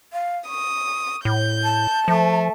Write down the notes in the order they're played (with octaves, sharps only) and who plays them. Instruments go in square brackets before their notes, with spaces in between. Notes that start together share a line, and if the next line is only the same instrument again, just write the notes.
[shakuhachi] F5
[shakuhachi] C#6 [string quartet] D#6
[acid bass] A2 [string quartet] G6
[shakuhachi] A5
[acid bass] F3 [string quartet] A3